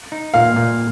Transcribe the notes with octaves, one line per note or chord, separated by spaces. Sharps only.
D#4
A#2 F5
A#2